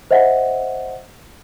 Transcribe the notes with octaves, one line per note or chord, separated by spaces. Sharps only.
C5 D#5 E5 F#5